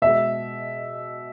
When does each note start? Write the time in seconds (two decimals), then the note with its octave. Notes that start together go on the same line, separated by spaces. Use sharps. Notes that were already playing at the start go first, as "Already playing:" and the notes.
0.02 B2 G#3 E5